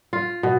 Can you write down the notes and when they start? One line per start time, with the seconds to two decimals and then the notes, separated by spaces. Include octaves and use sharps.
0.13 F4
0.43 B2